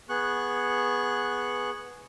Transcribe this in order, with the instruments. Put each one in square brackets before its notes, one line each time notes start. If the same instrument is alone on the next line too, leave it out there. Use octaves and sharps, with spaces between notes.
[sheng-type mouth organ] B3 G#4 C#6 F#6